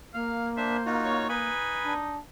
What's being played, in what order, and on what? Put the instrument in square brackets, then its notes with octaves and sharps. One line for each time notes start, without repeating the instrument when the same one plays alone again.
[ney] A#3 [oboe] F5
[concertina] D4 E5 [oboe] C5
[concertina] D#4 F4 F#4
[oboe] C#5
[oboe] D#4 [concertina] B4 G#5 B5
[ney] D4